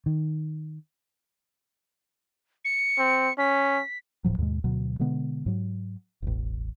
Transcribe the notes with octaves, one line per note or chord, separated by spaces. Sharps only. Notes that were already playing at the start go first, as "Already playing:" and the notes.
D#3
C#7
C4
C#4 B6
D1 A2 F3 F#3
D#2 G#2 B2 G#3
D2 B2 F#3
B2 D3 G#3 B3
G#2 F#3
E1 A1